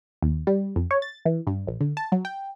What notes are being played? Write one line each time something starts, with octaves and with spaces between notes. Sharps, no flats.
D#2
G3
F2
C#5
A6
E3
G2
A#1
D3
A5
F#3
G5